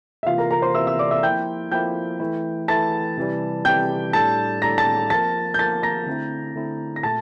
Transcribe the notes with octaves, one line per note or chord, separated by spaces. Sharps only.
E5
C3 E3 A#3 F4 F5
A#4 A#5
A#4 A#5
C5 C6
C3 E3 A#3 E5 E6
E5 E6
D5 D6
E5 E6
F3 A#3 E4 G5 G6
F3 A#3 E4 G5 G6
E3 A3 E4
E3 A3 E4 A5 A6
C3 E3 G3
C3 E3 G3 G5 G6
A2 G3 D4 A4 A5 A6
A2 G3 D4 A4 A#5 A#6
A5 A6
F3 A#3 F4 A#4 A5 A6
G6
F3 A#3 F4 A#4 A5 A6
A#5 A#6
D3 A3 C4 E4
D3 A3 C4 E4
A#6
A#2 A3 A5 A6